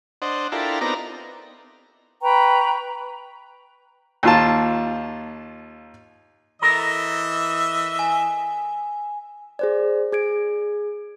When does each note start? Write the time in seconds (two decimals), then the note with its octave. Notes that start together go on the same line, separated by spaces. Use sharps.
0.22 D4 C5 D#5 F#5
0.52 D4 E4 F4 G4 A4 A#4
0.81 B3 C4 D#4 A#4 D5 A#5
2.22 B4 G5 A#5 C#6
4.23 D#2 F4 A5
6.62 E3 A4 A#4 D#5 E5 A#5
7.99 G#5
9.59 G#4 C5 D5
10.12 G#4 G#6 D7